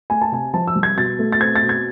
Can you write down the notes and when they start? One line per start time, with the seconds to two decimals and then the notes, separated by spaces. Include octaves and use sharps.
0.10 A3 G#5
0.21 A5
0.32 C3 G#5
0.54 F3 A5
0.67 E6
0.75 C2
0.83 G#6
0.97 B2 A6
1.19 A3
1.32 A6
1.40 C4 G#6
1.56 A6
1.62 B2
1.69 G#6